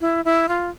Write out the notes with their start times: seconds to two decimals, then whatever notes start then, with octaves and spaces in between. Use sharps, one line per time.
0.01 E4
0.25 E4
0.49 F4